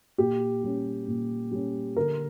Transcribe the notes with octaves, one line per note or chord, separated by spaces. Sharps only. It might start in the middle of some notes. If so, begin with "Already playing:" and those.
A#2 G4
G3 C#4
A#2
G3 C#4
D3 A#4